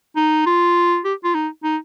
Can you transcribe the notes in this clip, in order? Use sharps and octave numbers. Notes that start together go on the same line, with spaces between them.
D#4
F4
G4
F4
D#4
D#4